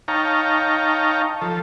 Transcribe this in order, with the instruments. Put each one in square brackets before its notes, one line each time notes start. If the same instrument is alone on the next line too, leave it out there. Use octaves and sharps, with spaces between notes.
[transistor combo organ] D#4 C#5 F5 G5 A5 A#5
F3 A4